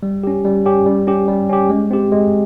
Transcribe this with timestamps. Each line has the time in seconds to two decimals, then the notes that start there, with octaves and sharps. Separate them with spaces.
0.03 G3
0.24 C#4 G4
0.45 G3
0.65 C#4 G4
0.86 G3
1.07 C#4 G4
1.28 G3
1.49 C#4 G4
1.70 G#3
1.91 C4 G4
2.12 G#3